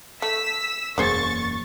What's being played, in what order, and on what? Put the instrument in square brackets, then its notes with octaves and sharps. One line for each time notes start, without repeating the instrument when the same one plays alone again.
[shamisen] A3 [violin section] E6 B6
[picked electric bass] E1 F#2 A#3 [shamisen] G#4 C5 D5 [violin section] C#6 A6